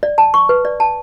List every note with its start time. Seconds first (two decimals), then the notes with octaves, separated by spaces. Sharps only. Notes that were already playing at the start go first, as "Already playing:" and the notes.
0.03 D5
0.18 A5
0.34 C#6
0.49 B4
0.65 D5
0.80 A5